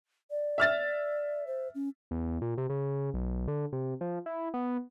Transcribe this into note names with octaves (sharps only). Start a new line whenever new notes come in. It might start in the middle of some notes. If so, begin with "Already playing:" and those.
D5
E5 F6 A6
C5
C#4
E2
A#2
C3
C#3
B1
D3
C3
F3
E4
B3